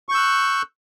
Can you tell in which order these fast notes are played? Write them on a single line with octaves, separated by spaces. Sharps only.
C#6 G6 E6 F#6